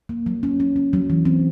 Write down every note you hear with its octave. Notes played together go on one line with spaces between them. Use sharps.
A#3
F#3
C#4
C#4
C#4
F#3
E3
C4